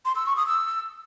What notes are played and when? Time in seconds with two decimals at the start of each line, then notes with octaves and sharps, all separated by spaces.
0.05 C6
0.16 E6
0.26 C#6
0.36 D#6
0.47 E6